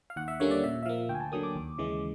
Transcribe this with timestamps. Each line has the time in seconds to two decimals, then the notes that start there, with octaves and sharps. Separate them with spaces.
0.10 F5
0.16 D#2 F#5
0.28 E5
0.40 D3 G3 A#3 C#4 C#5
0.51 D5
0.64 A#2 E5
0.83 E5
0.86 F3 A#3 F5
1.09 D2 G5
1.15 G#5
1.20 A5
1.32 D3 F#3 A#3 D#6
1.43 D6
1.56 D#2
1.78 C#3 E3 G#3